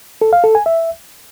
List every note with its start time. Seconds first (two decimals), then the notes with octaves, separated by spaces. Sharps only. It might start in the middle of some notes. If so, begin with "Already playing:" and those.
0.22 A4
0.33 F5
0.44 A4
0.55 G#5
0.66 E5